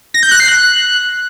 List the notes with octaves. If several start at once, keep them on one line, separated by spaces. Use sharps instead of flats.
A#6
G6
F#6
C7
F#6